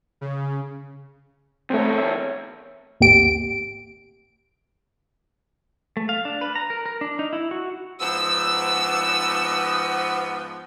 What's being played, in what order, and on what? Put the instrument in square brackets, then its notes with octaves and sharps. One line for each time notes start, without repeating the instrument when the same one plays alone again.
[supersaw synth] C#3
[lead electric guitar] E2 C#5 [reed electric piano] A3 C4
[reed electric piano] E5
[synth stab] A1 D#2 G4 D7
[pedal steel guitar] A3
F5
D4
B4
A#5
A#4
A#4
D4
D#4
E4
F#4
[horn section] G#2 F3 B3 [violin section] E6